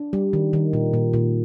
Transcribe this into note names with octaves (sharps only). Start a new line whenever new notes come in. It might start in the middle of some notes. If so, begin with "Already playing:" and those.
Already playing: D4
G3
D#3
D#3
A#2
A#2
A#2